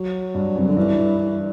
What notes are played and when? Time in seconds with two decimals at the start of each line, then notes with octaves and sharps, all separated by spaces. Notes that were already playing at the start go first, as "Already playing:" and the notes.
Already playing: F#3
0.35 G2
0.56 F#2
0.59 C3
0.68 D3
0.77 G2 E3
1.19 E3